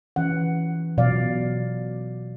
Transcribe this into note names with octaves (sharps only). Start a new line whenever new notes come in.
E3 C#4 F#5
B2 F#3 D5 F5